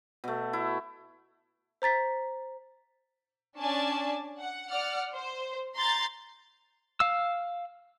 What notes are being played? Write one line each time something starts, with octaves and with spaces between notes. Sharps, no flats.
B2 A3
E4
C5 A#5 A6 B6
C#4 D4 D5 G#5 A5
F#5
D5 F#5 F6
C5
A#5 C6 G6 A6
F5 E6